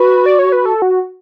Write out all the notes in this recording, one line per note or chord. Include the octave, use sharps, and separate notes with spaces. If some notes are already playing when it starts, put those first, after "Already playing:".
Already playing: F#4 B4
D5
C#5
B4
A4
F#4